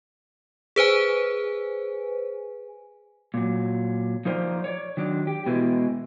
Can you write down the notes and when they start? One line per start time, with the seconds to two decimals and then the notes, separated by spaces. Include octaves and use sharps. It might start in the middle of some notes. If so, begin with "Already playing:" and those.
0.76 G#4 B4 C5 G#5
3.34 A#2 F#3
4.25 F3 D#4 A#4 C5 D5
4.64 C#5 D5
4.97 D#3 F#3 D4
5.27 G4
5.46 B2 E3 G#3